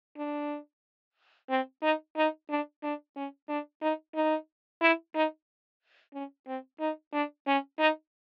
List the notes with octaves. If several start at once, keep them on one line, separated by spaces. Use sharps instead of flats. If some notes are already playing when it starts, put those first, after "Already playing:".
D4
C4
D#4
D#4
D4
D4
C#4
D4
D#4
D#4
E4
D#4
C#4
C4
D#4
D4
C#4
D#4